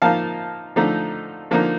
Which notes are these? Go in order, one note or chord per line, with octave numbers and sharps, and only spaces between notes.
F3 A#3 D#4 F5 A5
D3 F3 A3 D#4
D3 F3 A#3 D#4